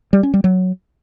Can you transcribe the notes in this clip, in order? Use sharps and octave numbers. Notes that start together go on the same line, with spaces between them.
G3
C#4
G3
F#3